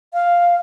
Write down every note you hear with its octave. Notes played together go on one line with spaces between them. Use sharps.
F5